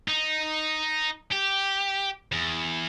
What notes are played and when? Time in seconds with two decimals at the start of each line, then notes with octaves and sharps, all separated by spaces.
0.08 D#4
1.32 G4
2.32 E2